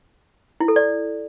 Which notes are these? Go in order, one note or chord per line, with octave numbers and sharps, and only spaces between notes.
E4
A4
D5